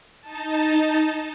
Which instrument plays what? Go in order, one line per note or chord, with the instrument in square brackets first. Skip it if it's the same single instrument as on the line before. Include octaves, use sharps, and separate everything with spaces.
[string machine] D#4 A5